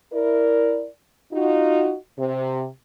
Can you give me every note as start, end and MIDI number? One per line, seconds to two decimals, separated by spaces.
0.13 0.87 64
0.13 0.87 70
0.13 0.87 74
1.33 1.95 63
1.33 1.95 65
1.33 1.95 66
2.19 2.66 48